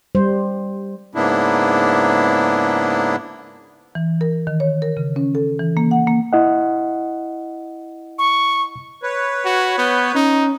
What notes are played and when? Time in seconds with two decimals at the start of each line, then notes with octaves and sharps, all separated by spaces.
0.15 G3 C5
1.15 G#2 C#3 A#3 B3 D4 E4
3.95 E3
4.21 A#4
4.47 D#3
4.60 C#5
4.82 A#4
4.97 C#3
5.16 C#4
5.35 A4
5.59 E3
5.77 A#3
5.91 F#5
6.07 A#3
6.33 E4 D#5 F#5
8.18 C#6
9.03 B4 C#5
9.45 F#4
9.78 B3 G6
10.15 C#4 D#4